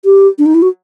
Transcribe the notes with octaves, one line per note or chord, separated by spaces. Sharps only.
G4
D4
D#4
E4
F#4